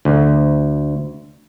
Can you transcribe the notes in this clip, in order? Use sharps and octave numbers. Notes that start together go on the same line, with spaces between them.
D2